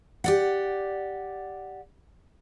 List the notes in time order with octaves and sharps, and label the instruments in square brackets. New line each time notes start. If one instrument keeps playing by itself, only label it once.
[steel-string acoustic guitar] G4 D5 F#5